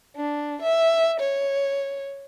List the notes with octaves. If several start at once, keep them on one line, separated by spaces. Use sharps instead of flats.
D4
E5
C#5